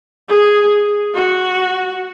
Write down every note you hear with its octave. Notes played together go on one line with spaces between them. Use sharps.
G#4
F#4